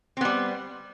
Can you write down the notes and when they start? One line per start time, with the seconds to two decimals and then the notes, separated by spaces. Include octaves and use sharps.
0.17 C4
0.21 B3
0.25 G3